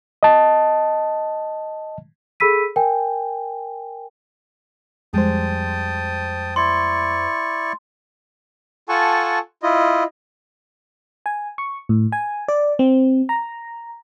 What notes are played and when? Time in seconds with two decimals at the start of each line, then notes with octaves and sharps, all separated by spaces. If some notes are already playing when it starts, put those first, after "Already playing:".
0.23 D#5 A5
2.40 G#4 A4 B5 E6 B6 D#7
2.76 A#4 G5 G#5
5.13 F2 G3 G#3 G4 C5 G5 A5 D#6
6.56 E4 D5 C6 C#6
8.89 F4 A4 F#5 G#5 A5 C#6
9.63 E4 F4 D#5
11.26 G#5
11.58 C#6
11.89 A2
12.12 G#5
12.48 D5
12.79 C4
13.29 A#5